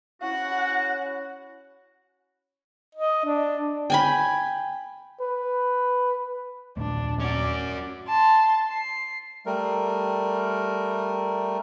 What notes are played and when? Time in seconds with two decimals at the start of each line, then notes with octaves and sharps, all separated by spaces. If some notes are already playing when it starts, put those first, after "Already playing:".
0.22 C#4 E4 F#4 F#5
2.95 D#5
3.25 D4
3.90 G5 G#5 B5
5.21 B4
6.77 D#2 A#2 A3 D4
7.20 C#4 F#4 D5
8.08 A5 C6
8.70 C7
9.46 G3 A3 A#4